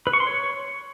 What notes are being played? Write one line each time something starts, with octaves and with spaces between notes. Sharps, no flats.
B4
C#6
C6
C#5